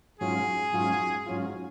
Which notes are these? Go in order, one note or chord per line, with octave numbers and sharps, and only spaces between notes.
G#2 F#3 C#4 F4 G#4
G#2 F#3 C#4 F4
G#2 F#3 C#4 F4